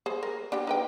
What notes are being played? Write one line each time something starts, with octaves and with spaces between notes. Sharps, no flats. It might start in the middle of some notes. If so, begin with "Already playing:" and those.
G#4 C5
A#4
D4 G4 G5
D#4 B4 G5